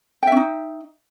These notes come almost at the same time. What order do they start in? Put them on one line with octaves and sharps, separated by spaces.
G5 E5 C#4 D#4